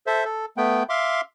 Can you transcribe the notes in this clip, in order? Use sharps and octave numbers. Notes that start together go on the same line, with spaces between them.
A4 C5 E5
A4
A3 B3 G5
E5 F5 C6 D6